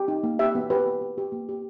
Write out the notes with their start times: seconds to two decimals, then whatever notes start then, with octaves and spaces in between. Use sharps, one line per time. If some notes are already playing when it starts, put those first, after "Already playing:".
Already playing: G4
0.08 D#4
0.23 A#3
0.39 G4 E5
0.55 B3
0.70 G4 B4
0.86 G4
1.01 G4
1.18 G4
1.32 A#3
1.49 G4